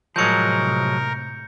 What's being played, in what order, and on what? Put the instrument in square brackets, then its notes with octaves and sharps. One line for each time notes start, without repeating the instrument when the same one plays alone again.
[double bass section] A2 C3 [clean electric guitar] F3 F#3 G#3 [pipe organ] A#4 [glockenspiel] G6 C#7